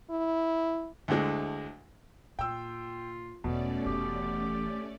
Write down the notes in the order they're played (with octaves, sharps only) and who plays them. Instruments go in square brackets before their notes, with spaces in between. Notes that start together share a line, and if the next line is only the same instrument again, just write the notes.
[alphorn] E4
[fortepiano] D2 A2 D3 G#3
[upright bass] A#2 [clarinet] F4 [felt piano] G5 E6
[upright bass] E1 E2 [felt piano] B2 [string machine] A3 C#4 D5
[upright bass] F1 E3 [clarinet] G4